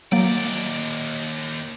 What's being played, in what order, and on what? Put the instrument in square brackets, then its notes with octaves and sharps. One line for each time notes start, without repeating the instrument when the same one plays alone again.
[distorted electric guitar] D#2 D5 [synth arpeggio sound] F#3 A#3